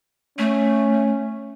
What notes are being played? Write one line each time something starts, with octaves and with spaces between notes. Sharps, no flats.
A3 C#4